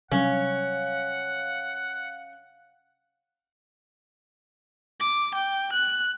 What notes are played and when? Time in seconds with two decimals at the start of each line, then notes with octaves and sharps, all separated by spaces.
0.12 C3 F#3 G3 C#4 F5 F#5
5.00 D6
5.35 G5
5.72 F#6